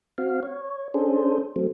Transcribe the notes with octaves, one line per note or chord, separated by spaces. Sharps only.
C4 F#4 F5
C#5
C#4 D4 G#4 A4 C5
F#3 A3 C4